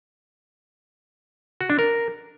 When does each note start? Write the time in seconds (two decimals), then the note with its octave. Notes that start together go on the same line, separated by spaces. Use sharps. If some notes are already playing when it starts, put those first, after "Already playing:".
1.61 F#4
1.70 D4
1.79 A#4